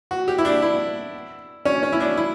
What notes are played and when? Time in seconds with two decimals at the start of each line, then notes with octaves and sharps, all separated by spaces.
0.11 F#4
0.28 G4
0.38 E4
0.45 D4
0.62 E4
1.65 C#4
1.83 C#4
1.92 E4
2.00 D4
2.17 E4